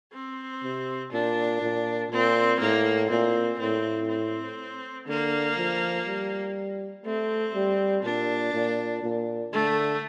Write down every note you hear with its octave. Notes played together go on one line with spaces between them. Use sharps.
C4
C3
A#2 D4
A#2
A#2 C4
A2 A#3
A#2 C4
A2 C4
C4
D3 A#3
F3
G3
A3 C4
G3
A#2 D4
A#2
A#2
D3 A3